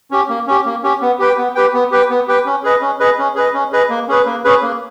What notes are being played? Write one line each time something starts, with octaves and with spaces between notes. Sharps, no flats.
C#4 G4
A#3
C#4 G4
A#3
C#4 G4
B3
G4 B4 G5
B3
G4 B4 G5
B3
G4 B4 G5
B3
G4 B4 G5
C#4
G#4 B4 D#5
C#4
G#4 B4 D#5
C#4
G#4 B4 D#5
C#4
G#4 B4 D#5
A#3
C#4 G#4 B4
A#3
C#4 G#4 B4
A#3